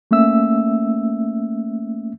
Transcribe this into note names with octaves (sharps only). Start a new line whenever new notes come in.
A3 A#3 C#4 E5 E6